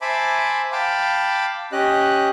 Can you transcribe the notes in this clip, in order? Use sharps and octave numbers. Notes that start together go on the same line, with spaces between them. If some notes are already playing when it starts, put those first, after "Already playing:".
C5 E5 G#5 A5 B5 D6
F5 G5 A5 B5 D6
C#4 G4 D#5 F#6